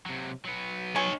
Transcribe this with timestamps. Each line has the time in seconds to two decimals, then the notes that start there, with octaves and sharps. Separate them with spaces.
0.06 C3 F#3
0.45 F#3 B3
0.96 D#4 C#5 G#5 C#6